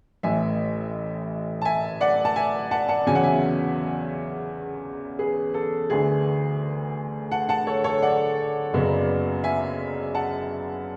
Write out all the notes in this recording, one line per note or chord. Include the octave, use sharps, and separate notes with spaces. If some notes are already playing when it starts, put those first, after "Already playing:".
A1 A2 E3 E5 G#5
A5
E5 G#5
D5 F#5
A5
E5 G#5
F#5 A5
F#5 A5
E2 C#3 F#3 C#4 G#5
F#5
E5 G#5
G#4 B4
A4
D2 D3 A3 G#4 B4
F#5 A5
F#5 A5
A4 C#5
A4 C#5
D5 F#5
F#1 F#2 C#3 F#3 B3
E5 G#5
F#5 A5